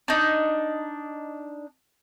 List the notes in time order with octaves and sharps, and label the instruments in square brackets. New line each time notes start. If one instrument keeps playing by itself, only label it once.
[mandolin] D4 D#4